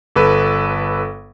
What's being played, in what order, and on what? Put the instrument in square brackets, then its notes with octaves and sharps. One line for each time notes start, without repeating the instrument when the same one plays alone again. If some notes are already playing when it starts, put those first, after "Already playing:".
[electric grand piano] G1 A4 B4